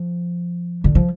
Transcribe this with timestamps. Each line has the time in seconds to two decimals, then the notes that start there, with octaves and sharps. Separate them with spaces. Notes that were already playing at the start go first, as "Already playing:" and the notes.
Already playing: F3
0.84 D3
0.95 F3